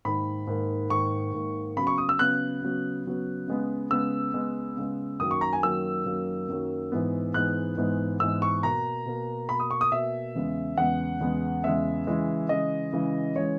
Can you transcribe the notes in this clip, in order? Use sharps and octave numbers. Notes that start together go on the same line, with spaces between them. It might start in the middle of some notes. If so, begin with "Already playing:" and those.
G#2 D#3 A#3 B5
G#2 D#3 A#3
G#2 D#3 A#3 C#6
G#2 D#3 A#3
C#3 F#3 B3 B5
C#6
D#6
E6
C#3 F#3 B3 F#6
C#3 F#3 B3
C#3 F#3 B3
C#3 G#3 B3
C#3 G#3 B3 E6
C#3 G#3 B3
C#3 G#3 B3
F#2 D#3 F#3 A#3 D#6
C#6
A#5
G#5
F#2 D#3 F#3 A#3 E6
F#2 D#3 F#3 A#3
F#2 D#3 F#3 A#3
G#2 E3 G#3 B3
G#2 E3 G#3 B3 F#6
G#2 E3 G#3 B3
G#2 E3 G#3 B3 E6
C#6
B2 A#3 A#5
B2 A#3
B2 A#3 B5
D#6
C#6
D#6
B2 A#3 E5
E2 C#3 G#3 B3
E2 C#3 G#3 B3 F#5
E2 C#3 G#3 B3
E2 C#3 G#3 B3 E5
C#3 E3 G#3
C#3 E3 G#3 D#5
C#3 E3 G#3
C#3 E3 G#3 C#5